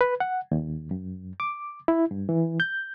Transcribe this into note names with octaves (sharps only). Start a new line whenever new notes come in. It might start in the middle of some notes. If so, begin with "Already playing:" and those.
B4
F#5
D#2
F#2
D6
E4
G2
E3
G6